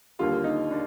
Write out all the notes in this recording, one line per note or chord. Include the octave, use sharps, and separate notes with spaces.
D#2 D3 G3 F4
D#4
D4